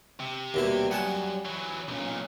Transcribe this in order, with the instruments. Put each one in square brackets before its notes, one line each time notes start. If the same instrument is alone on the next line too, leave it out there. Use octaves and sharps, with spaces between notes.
[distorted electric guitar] C3
[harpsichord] D#2 B2 E4 [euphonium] G3
[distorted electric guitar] F#2 [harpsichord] F#5 G#5 A5
[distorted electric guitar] E3 F#3
[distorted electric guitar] B1 A#2 [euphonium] C#4